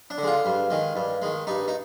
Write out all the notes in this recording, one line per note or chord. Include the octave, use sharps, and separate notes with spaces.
D4
D3
G#3 F4
G2
D#3 G#3
G2
D#3 G#3
G2 D#4
D#4